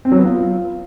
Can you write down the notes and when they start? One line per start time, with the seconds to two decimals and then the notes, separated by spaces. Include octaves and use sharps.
0.05 C4
0.12 F#3
0.18 B3
0.25 F4